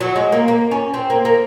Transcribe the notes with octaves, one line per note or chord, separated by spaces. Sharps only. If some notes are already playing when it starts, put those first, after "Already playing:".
F#3
G#3
A#3
A#3
C#4
C4
A#3
A#3